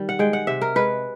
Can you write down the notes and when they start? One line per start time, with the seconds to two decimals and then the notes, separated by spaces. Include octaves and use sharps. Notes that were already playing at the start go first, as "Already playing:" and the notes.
Already playing: D#3 G3
0.09 F#5
0.19 G#3 G5
0.33 F#5
0.47 C3 E5
0.62 A#4
0.75 G#3 B4